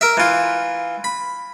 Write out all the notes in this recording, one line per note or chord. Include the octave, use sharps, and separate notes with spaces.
A#4 E5
E3 F4
B5